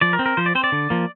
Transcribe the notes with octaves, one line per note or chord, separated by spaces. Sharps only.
F3 D5
A#4
C4
A#4
F3 C5
D5
C4 C5
D5
D3
F3 A#3